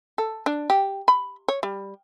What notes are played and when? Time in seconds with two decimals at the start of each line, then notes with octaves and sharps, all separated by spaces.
0.18 A4
0.46 D4
0.70 G4
1.08 B5
1.48 C#5
1.63 G3